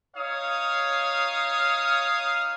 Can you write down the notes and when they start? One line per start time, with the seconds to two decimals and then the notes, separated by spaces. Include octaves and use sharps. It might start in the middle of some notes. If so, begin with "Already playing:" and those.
0.16 D#4 C#5 F5 D#6